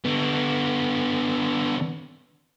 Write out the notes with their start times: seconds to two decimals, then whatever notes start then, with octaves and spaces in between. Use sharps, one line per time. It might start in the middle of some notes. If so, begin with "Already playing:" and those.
0.05 D3 B3